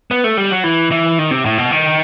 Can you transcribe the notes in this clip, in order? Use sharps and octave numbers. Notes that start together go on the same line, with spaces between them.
B3
A3
G3
F#3
E3
E3
D#3
C3
A2
B2
D#3